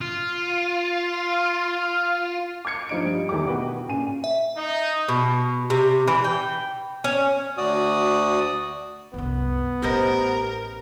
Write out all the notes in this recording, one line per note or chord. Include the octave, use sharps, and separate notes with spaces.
F4
F5
D6 F6 G#6 C#7
G2 F3 D#4 D7
G3
E2 D#3 E4 G4 D6
B2 F#4 B4 G5
A#2 C#3 G#5 D#7
E5
D#4
B2
C3
E3
G5
C#4
D2 F#4 D5 D#6
C2 F#2 B3
A1 A3 G4 A#4 C5 D#5